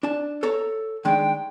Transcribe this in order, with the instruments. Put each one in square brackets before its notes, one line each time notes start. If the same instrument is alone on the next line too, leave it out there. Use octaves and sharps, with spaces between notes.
[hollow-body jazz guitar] D4 A5
A4 C#5 A#5
[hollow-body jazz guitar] D#3 G#3 D4 [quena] G5